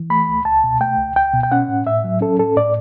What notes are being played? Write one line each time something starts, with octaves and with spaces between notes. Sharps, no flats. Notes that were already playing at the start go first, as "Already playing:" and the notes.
Already playing: E3
A3 B5
C#2
C#2 A5
B2
A3 G5
C#2
C#2 G5
B2
G5
C#4 F#5
A2
A2 E5
F#3
C#4 A4
A2 A4
A2 D5